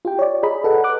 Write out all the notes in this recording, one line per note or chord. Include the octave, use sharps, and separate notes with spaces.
F4 G4 G5
C#5 D5
G#4 D#5 A#5 B5
A4 B4 F#5
D6 F#6